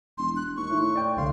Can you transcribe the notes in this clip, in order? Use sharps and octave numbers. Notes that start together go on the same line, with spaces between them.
E1 C6
F#6
D#2 C#6
A2
D5 G5
C2 D3 F5 C6